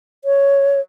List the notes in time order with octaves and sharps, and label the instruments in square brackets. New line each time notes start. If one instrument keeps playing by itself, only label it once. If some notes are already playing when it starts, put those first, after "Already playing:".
[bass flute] C#5